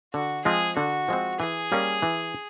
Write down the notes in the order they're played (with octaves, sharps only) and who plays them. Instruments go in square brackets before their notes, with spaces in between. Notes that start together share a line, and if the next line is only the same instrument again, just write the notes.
[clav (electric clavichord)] D3 [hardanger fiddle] F#4
[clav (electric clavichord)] F3 G#3 C4 [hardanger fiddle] G#4
[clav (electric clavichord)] D3 [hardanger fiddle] F#4
[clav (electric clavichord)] F3 G#3 C4
[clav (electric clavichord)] E3 [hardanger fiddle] G#4
[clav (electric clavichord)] G3 A#3 C#4
E3